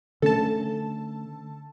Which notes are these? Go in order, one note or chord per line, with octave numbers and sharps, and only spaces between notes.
D3 A3 C#4 A4 A5